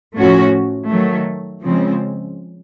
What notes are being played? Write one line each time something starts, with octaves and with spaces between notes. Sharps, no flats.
A2 F3 A3 C#4 F#4
D#3 F#3 A3
C#3 F3 G#3 C4